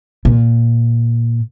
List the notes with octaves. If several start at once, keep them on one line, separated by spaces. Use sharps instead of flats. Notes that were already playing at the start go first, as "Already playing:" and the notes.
A#2